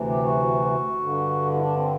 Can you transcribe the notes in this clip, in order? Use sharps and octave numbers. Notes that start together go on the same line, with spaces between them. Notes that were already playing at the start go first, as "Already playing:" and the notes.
Already playing: D2 C3 E3
G4
F#4
G2 D3
E4
D4
C4